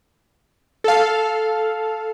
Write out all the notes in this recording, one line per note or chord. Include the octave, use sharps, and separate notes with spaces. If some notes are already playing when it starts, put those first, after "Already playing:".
A4 F5